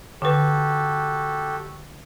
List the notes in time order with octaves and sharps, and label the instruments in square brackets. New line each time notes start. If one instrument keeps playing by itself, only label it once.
[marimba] D3 B4 [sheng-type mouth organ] F#4 G4 A4